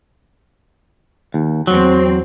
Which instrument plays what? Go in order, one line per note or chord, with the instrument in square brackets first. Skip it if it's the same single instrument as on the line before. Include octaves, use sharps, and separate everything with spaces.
[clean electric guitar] D#2
[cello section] E2 C4 [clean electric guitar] F#3